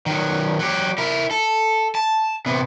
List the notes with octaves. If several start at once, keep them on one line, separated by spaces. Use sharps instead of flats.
D#3 F#3
F#3 G4
E4 A#4
A4
A5
C3 B3